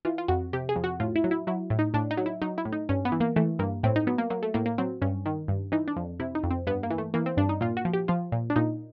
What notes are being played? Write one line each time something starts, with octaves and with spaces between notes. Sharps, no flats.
E3 F4
F4
F2 F#4
C3 G4
G#4
F2
F#4
A2 F4
E4
F#3
E4
F#3 E4
A2
D#4
A2 D4
D#4
F#3
E4
F#3 D#4
E4
A2
D#4
G2 C#4
B3
E3
A#3
E3 A3
G2 A#3
A2 C4
D#4
F#3 B3
A#3
F#3 A#3
A3
A2 A#3
A#3
F#3 C4
G2 C#4
D#3
G2
E3 D#4
D4
F2
C3 E4
D#4
F2
C4
G2 B3
A#3
E3
A3
E3 A#3
C4
G2 D4
D#4
A#2 F4
F#4
F3
G4
F3 F4
A#2
D4
A#2 D#4